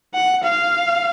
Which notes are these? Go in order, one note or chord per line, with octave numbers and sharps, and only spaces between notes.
F#5
F5